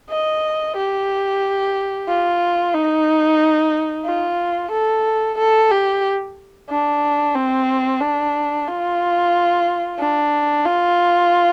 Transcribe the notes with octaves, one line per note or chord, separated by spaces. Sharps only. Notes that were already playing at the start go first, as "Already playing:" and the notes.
D#5
G4
F4
D#4
F4
A4
A4
G4
D4
C4
D4
F4
D4
F4